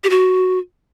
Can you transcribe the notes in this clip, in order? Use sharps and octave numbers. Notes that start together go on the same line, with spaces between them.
G4
F#4